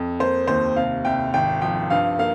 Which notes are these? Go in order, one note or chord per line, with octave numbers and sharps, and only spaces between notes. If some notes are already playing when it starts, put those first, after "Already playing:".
Already playing: F2
A#3 C5
D#2 C5
C3 F5
C2 G5
G#1 G5
F3 G5
G2 F5
A#3 F5